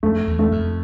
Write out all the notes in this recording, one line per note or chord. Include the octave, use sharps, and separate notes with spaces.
F2 A3
E2
A3
F2